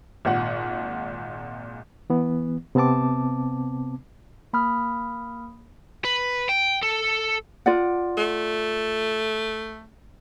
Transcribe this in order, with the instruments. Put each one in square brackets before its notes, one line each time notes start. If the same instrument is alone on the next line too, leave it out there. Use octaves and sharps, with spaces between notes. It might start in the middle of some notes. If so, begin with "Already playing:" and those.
[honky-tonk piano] G#1 A#2 F#5
[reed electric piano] E3 B3
C3 B3 C4 A5 D6
[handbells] A#3 B5 D#6 F6
[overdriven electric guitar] B4
G5
A4
[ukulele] F4 D5 F#5
[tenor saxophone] A3